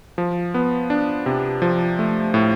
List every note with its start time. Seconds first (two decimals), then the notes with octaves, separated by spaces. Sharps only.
0.18 F3
0.54 B3
0.90 D4
1.26 C3
1.62 F3
1.99 A3
2.34 A2